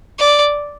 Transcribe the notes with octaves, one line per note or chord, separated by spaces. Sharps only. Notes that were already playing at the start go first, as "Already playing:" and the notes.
D5